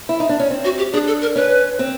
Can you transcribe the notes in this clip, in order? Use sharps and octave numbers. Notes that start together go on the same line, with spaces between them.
E4
D#4
D4
C#4
C4
F#4
G4
D4 G#4
A4
A#4
C#4 B4
C4